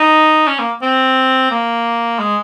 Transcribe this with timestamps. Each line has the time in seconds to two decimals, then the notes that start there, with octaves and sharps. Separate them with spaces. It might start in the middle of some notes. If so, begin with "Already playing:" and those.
Already playing: D#4
0.48 C#4
0.59 A#3
0.82 C4
1.51 A#3
2.19 G#3